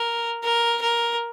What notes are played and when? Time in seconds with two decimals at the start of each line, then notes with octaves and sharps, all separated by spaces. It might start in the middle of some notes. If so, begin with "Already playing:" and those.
Already playing: A#4
0.44 A#4
0.81 A#4